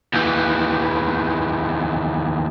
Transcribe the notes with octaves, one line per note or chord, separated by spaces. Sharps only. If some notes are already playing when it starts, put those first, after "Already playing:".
D#2 E3